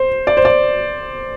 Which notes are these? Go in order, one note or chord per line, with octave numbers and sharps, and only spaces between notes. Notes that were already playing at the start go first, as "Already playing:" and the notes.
Already playing: C5
D5
C5
D5